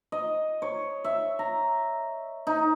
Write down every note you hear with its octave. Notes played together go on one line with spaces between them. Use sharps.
D#5
C#5
E5
A#5
D#4